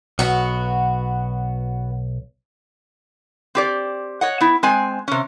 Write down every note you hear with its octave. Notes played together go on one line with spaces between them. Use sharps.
B1 B3 F#4
C4 G4 D5
C#5 D#5 F#5
B3 E4
G#3 C4 G#5
C3 C#4